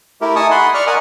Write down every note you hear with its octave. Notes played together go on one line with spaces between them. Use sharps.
A3 E4 G4 A#4
D#4 G#5 A5 C#6 D#6
F#5 B5 C6
D5 C#6 F6
A#4 D5 D#5 F#5 G#5